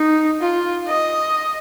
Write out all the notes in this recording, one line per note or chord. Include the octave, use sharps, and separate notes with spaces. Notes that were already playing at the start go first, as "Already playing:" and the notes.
Already playing: D#4
F4
D#5